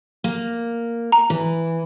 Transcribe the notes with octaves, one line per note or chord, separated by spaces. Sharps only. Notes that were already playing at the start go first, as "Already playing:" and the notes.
A#3
A#5
E3